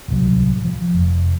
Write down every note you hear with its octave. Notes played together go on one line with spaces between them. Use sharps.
D1 C2 F#3
F3
F1